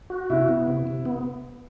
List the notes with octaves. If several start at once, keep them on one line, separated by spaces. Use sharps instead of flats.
F#4
C3 E4
B3
C3
C3
B3